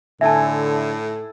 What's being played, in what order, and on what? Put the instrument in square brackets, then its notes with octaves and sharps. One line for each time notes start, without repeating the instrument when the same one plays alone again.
[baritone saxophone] A2 [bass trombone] D3 [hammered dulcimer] E4 A4 G#5 [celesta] E5 A5